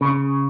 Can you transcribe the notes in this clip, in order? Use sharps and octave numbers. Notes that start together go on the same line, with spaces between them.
C#3